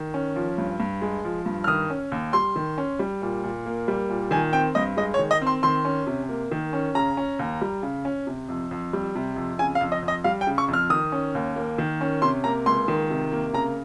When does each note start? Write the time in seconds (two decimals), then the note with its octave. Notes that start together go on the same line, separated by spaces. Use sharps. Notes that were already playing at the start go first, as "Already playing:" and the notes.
Already playing: D#3
0.14 C#4
0.36 F3
0.58 G2
0.80 G2
1.02 G#3
1.24 F3
1.46 G2
1.64 F6
1.67 D#3 D#6
1.90 C#4
2.12 D#2
2.33 G3 C6
2.56 D#3
2.78 C#4
2.99 G3
3.22 A#2
3.43 A#2
3.66 A#3
3.88 G3
4.09 A#2
4.31 D#3 G#5
4.53 C4 G5
4.75 G2 D#5
4.97 G#3 D#5
5.14 C#5
5.19 D#3
5.31 D#5
5.42 C4
5.47 C6
5.63 D#3 C6
5.85 C#4
6.07 C3
6.29 A#3
6.51 D#3
6.73 C#4
6.95 C#3 A#5
7.17 C#4
7.39 D#2
7.61 G3
7.83 C#3
8.05 C#4
8.27 C3
8.48 F2
8.71 F2
8.93 G3
9.15 C3
9.36 F2
9.59 C#3 G#5
9.75 F5
9.81 F2
9.92 D#5
10.03 F2
10.08 D#5
10.24 G3 F5
10.41 G5
10.47 C#3
10.58 C#6
10.68 F2
10.73 F6
10.90 D#3 D#6
11.12 C#4
11.35 D#2
11.56 A#3
11.78 D#3
12.01 C#4
12.22 C3 C6
12.44 A#3 A#5
12.66 C#2 C6
12.88 D#3
13.10 C3
13.32 A#3
13.53 C#3 A#5